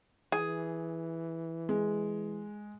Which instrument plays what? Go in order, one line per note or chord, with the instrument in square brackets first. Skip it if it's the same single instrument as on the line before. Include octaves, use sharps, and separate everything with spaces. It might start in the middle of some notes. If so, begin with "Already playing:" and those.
[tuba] E3 [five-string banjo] G#4
[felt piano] G#3